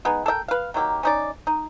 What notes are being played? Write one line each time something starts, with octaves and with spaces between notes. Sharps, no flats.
G#3 B3 D#4
A4 A#4 D#5 G5
B4 F5
D#3 F#3 A#3 G4
C#4 D#4 D5
D#4